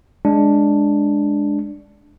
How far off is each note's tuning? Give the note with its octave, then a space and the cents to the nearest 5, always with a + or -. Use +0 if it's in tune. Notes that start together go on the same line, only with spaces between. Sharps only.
G#3 +0 D4 +0